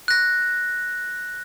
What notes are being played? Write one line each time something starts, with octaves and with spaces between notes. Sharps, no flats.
F#6 A#6